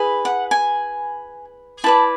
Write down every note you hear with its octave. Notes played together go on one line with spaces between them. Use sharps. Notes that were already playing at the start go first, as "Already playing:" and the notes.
Already playing: E4 G#4 B4
F#5
G#5
E4 B4 D5 A5